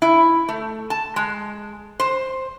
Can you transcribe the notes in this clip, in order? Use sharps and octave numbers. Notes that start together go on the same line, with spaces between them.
E4
A3
A5
G#3
C5